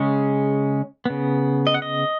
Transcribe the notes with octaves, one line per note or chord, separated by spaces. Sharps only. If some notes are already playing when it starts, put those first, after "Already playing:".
Already playing: C#3 G#3 C#4
C#3 B3
D#5
F#5
D#5